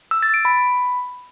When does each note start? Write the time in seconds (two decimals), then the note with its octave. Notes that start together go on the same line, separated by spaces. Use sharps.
0.11 E6
0.23 A6
0.34 D7
0.45 B5